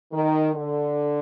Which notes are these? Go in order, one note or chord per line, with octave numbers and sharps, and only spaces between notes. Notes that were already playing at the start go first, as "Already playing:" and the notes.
D#3
D3